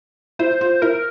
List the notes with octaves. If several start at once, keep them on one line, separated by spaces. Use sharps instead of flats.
E4 C5
F4
E4 A#4